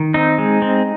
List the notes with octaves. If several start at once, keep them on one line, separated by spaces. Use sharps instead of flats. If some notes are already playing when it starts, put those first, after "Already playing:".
Already playing: D#3
C4 D#4
G#3
C4